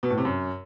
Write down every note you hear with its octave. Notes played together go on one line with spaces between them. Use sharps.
B2
A2
C3
F#2